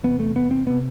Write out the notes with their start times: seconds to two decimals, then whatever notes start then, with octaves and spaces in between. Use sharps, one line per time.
0.03 E2 C3 B3
0.19 A3
0.36 B3
0.51 C4
0.67 C3 B3